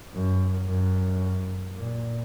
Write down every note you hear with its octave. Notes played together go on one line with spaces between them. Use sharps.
F#2
F#2
A#2